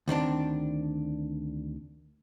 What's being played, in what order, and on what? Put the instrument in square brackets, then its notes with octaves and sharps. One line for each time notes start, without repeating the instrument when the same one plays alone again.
[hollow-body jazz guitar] D2 D#3 C4 D4